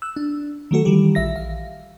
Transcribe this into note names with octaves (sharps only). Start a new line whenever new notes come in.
E6 F#6
D4
D#3 F#3 A3 F#4 A4
D#3 E3 G3 G4
A#1 E5 A#6
F5